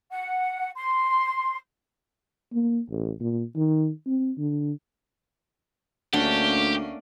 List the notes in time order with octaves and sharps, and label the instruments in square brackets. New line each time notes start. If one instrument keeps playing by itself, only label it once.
[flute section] F#5
C6
[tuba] A#3
A1
A#2
D#3
C4
D3
[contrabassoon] D2 [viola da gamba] A3 A#3 C#4 [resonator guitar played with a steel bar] D4 F#5 [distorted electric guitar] G4